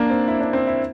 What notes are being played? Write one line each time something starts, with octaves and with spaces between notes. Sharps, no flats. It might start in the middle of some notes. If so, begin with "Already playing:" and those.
Already playing: A#3 D4
C4
E4
D4
C4
E4